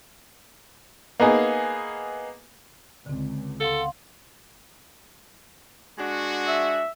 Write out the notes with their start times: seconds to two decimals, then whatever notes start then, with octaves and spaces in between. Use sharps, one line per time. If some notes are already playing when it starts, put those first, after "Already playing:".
1.20 A#3 B3 D#4 G#4
3.06 C#2 D3 C4
3.60 A4 F5 F#5 C6
5.98 G#3 D4 F#4
6.48 E5